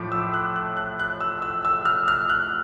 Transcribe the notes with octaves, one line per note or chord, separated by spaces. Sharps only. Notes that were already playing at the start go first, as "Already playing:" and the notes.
Already playing: A2 F3 A3 D6
E6
F#6
F#6
F#6
F#6
E6
E6
E6
F6
F6
F#6